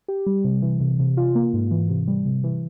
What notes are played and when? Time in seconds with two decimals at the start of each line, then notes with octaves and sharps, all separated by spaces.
0.08 G4
0.26 G3
0.44 C3
0.62 E3
0.80 C3
0.99 C3
1.17 F4
1.35 A#3
1.53 G#2
1.71 E3
1.89 C3
2.08 G3
2.25 C3
2.44 E3